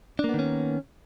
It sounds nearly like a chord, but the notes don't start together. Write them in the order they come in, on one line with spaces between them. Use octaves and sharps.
D4 A#3 B3 D#3 C#4